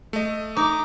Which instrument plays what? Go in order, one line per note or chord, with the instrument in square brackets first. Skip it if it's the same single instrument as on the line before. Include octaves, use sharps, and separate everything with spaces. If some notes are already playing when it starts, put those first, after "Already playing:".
[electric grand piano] A3 D#5
[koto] D#4 [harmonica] D6